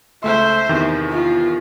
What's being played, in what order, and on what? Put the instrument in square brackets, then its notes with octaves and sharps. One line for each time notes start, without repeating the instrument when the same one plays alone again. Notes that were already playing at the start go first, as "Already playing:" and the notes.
[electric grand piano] C#2 A3 C6 [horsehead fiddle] C5 E5
[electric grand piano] E2 C3 D#3
[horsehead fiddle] F4